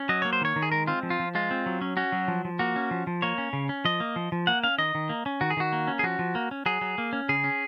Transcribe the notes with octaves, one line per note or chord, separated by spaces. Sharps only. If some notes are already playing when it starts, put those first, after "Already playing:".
Already playing: C#4
F#3 D#5
A#3 C#5
C5
D#3 C#5
D#3
G#4
G#3 A#4
C4 F4
F3
F4
F3
G#3 F4
C4
F#3
C#4
C#4 F#4
F#3
F3
F3
A#3 F#4
C#4
F3
F3
A#3 C#5
C#4
C#3
C#4
F3 D#5
A#3
F3
F3
A#3 F#5
C#4 F5
D#3 D#5
D#3
A#3
C#4
D#3 F#4
G#4
D#3 F#4
A#3
C#4
G#4
F3 F#4
F3
A#3
C#4
F#3 G#4
F#3
A#3
C#4
C#3 G#4
C#4